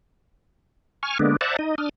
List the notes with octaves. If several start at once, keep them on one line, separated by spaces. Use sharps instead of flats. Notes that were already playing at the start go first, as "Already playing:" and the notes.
G#5 C#6 F6
D3 G#3 A#3 B3 D4
C5 D5 E5 F#5 A5 A#5
D#4 D#5
D4 D#6 F6